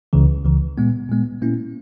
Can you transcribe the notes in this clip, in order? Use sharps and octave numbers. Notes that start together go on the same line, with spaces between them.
C#2 C#3 E3
C#2 C#3 E3
A#2 G#3 B3
A#2 G#3 B3
A#2 A#3 C#4 E4